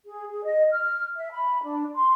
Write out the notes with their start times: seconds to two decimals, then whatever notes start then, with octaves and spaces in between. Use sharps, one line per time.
0.06 G#4
0.30 G#4
0.45 D#5
0.71 F6
1.16 E5
1.32 B5
1.62 D4
1.94 C6